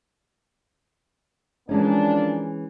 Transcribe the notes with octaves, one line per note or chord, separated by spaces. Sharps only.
E3 F3 G#3 A#3 C#4 D4